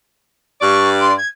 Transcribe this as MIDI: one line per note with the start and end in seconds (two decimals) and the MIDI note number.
0.61 1.13 43
0.61 1.13 74
0.61 0.89 85
1.01 1.16 84
1.18 1.28 92